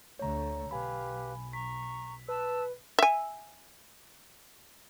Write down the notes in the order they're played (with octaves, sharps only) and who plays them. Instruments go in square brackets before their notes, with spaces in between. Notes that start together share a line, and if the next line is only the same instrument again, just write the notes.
[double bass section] D2 D3 A3 [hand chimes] C#5 A#5
[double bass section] B1 [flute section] G4 B4 F5 [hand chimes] G#5 B5
[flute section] A#5 C#6 [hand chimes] B6
[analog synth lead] B4 [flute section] A5 E6
[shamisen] E5 G#5